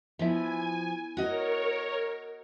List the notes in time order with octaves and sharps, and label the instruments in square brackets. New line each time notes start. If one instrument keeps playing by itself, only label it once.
[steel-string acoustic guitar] F3 [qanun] B3 E4 [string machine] G#5
[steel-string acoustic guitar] F#4 D#5 [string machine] A#4 C#5